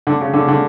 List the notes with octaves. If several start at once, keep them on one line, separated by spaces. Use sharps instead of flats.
D3
C#3
D3
D3